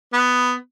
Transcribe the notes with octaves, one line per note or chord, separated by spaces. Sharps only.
B3